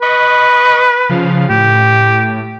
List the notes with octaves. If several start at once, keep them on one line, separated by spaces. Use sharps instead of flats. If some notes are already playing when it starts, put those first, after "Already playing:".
B4 D#5 B5 C#6
C#3 F3 F5
A2 G4